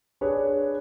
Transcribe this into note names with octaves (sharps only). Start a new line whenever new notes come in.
D4 G#4 B4 C#5